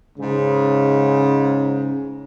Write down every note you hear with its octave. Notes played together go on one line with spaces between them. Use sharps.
G#2 C#3